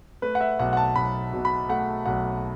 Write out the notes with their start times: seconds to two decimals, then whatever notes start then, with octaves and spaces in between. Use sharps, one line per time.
0.22 A3 B4
0.35 F#5
0.41 E5
0.59 B1 F#5
0.73 F#5
0.77 A5
0.96 B1 B5
1.33 B2
1.45 B5
1.69 A3 F#5
2.06 B1 F#5